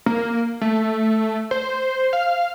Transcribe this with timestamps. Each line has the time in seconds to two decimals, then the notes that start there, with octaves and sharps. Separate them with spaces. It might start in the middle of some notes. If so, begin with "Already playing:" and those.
0.06 A#3
0.61 A3
1.51 C5
2.13 F5